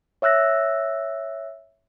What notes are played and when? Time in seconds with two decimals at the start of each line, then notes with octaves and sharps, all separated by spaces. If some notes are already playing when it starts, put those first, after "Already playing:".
0.22 C#5 E5 E6 F#6 A#6